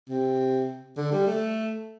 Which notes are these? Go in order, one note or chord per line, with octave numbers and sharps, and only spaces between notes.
C3
D3
G3
A3